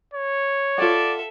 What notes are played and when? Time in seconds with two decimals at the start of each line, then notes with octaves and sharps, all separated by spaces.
0.14 C#5
0.78 F4 A4 D5 E5 F#5